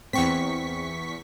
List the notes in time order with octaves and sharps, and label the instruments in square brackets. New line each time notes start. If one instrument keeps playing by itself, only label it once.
[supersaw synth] E2 C#6 B6 [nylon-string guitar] C4